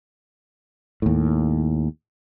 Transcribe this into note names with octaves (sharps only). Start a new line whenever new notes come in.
D#2 A2